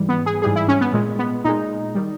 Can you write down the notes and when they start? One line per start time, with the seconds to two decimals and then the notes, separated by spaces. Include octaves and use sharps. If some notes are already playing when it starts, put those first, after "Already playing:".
Already playing: G#2 E3 G3
0.09 B3
0.26 G#4
0.42 G#2 E3 G3 G#4
0.56 E4
0.68 C#4
0.81 B3
0.93 A#2 G#3
1.19 B3
1.44 A#2 G#3 D#4
1.95 D#3 G3